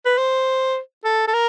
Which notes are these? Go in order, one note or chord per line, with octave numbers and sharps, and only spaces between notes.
B4
C5
A4
A4
A#4